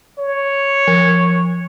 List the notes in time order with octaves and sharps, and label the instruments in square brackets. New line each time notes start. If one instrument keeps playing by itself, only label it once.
[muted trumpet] C#5
[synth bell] F3